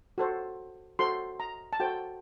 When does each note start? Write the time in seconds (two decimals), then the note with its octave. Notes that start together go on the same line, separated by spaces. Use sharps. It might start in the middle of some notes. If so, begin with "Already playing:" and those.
0.18 F#4 A4 C5
0.99 F#4 A4 C5 C6
1.40 A#5
1.73 A5
1.80 F#4 A4 C5 G5